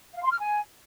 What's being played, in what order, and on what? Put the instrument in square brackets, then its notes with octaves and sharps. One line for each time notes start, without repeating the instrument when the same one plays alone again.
[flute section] F5
C6
F6
G#5